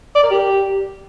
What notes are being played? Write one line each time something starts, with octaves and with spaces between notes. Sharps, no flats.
D5
A#4
G4